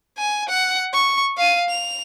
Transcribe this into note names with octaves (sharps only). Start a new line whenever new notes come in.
G#5
F#5
C#6
F5 D#7
F7